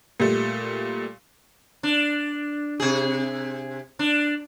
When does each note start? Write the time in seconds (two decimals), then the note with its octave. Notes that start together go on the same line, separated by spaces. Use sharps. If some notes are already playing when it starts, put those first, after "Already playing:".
0.20 A#2 G3 A3
1.83 D4
2.80 C3 G#4
3.99 D4